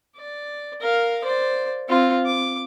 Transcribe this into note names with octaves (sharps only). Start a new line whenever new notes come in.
D5
A#4 F5
C5 D5
C4 F4
D6